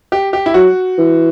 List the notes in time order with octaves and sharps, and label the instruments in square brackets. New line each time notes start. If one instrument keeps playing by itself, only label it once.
[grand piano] G4
G4
E4
[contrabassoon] F#3 [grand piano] F#4
[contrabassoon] E3